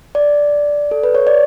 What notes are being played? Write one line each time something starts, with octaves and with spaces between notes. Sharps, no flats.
D5
A4
B4
C#5
D5